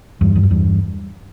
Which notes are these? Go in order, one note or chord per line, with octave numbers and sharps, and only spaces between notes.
E2 G2
E2
F2
E2 G2